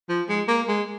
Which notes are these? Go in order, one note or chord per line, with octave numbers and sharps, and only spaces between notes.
F3
G#3
A#3
G#3